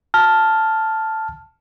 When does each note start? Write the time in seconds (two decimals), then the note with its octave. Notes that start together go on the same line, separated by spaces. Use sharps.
0.14 A5 F6